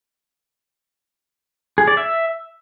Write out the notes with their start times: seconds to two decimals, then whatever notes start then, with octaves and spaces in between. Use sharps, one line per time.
1.78 G#4
1.88 D5
1.97 E5